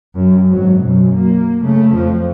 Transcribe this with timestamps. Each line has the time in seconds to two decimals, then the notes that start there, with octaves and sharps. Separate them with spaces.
0.15 F#2
0.48 G#1 F#3
0.80 F#2 B2
1.13 A#3
1.62 C#3 A3
1.94 F2 F3